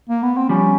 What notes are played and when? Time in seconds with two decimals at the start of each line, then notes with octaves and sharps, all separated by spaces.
0.09 A#3
0.22 B3
0.37 C4
0.49 F3 G3 C#4